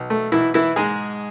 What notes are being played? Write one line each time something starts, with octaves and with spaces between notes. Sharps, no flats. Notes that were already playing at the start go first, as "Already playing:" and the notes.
Already playing: B1
A3
B1 E3 E4
E3 E4
G#2 G#3 G#4